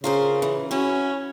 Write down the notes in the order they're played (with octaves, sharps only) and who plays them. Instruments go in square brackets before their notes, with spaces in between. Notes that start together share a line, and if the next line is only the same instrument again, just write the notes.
[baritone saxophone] C#3 [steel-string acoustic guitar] F4 A#4 C5
[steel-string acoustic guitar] E3
[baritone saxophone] C#4 [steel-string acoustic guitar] E4 F#4